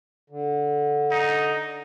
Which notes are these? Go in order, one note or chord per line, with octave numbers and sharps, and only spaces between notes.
D3
D#4